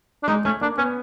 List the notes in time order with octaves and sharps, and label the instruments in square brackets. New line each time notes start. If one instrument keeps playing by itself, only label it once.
[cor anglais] D4
[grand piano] G#3 [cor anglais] D#4
[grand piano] A3 [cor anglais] C#4
[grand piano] A#3 [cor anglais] D4
[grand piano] B3 [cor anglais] C#4